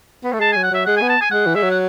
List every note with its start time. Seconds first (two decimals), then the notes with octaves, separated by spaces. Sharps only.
0.24 B3
0.33 A3
0.40 G#3 A5
0.52 F#3 G#5
0.63 F#5
0.71 F#3 E5
0.86 G#3 F#5
0.97 B3 G#5
1.09 A5
1.21 G#5
1.31 G#3 F#5
1.46 E3
1.55 G#3 E5
1.63 F#3
1.71 F#5